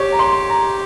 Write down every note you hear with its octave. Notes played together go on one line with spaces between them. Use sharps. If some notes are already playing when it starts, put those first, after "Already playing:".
Already playing: G4 C#5
A#5
C6
A#5